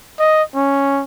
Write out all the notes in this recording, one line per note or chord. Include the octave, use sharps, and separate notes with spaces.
D#5
C#4